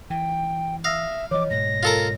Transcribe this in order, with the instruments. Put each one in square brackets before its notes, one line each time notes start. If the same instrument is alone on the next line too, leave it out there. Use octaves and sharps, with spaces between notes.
[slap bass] E3 [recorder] G5
[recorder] E5 [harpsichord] F5 [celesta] D#6 E6 A#6
[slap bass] E3 F3 [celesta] C#5 D#5 [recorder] D6
[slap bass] G#2 B2 [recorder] A#6
[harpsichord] F4 A4 A#4